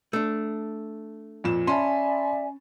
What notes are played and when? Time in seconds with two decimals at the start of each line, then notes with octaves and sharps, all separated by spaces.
0.13 A3 D4
1.44 F2 A#2 E7
1.67 C#4 D5 E5 G#5 A5 B5 C6